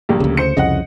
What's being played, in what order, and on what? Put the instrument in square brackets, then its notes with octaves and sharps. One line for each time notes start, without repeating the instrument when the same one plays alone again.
[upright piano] A#1 G3 A#3
[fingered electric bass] D2 C#3
[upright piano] C5 C#7
[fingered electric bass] C2 F2 C#3 [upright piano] D#5 F#5